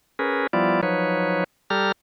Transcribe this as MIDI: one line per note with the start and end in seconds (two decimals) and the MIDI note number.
0.19 0.47 61
0.19 0.47 68
0.19 0.47 70
0.19 0.47 71
0.53 0.81 53
0.53 0.81 55
0.53 0.81 59
0.53 0.81 64
0.53 0.81 65
0.53 0.81 74
0.83 1.44 53
0.83 1.44 54
0.83 1.44 63
0.83 1.44 71
0.83 1.44 73
1.70 1.92 55
1.70 1.92 67
1.70 1.92 69
1.70 1.92 82
1.70 1.92 89